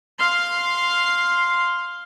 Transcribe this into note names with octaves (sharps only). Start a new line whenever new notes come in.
F5 C6